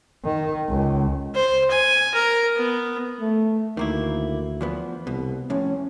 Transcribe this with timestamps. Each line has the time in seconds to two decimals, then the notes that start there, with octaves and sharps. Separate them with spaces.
0.25 D#3
0.69 C#2
1.35 C5
1.71 G#5
2.14 A#4
2.57 B3
3.21 A3
3.77 D2 D#3 A#3 E4
4.61 E2 F3 B3
5.07 C2 B2
5.50 F2 A2 C#4